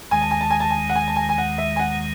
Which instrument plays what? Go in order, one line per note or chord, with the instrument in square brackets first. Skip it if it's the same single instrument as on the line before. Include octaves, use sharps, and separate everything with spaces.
[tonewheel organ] D#2 D#3 G#3 [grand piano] G#5
[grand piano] A5
G#5
A5
G#5
A5
G#5
F#5
G#5
A5
G#5
G#5
F#5
E5
G#5
F#5